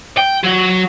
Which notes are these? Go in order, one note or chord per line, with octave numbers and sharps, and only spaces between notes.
G5
F#3